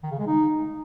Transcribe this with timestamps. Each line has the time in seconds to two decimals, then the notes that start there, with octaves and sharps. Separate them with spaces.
0.03 D#3
0.11 C#3
0.19 G#3
0.27 D#4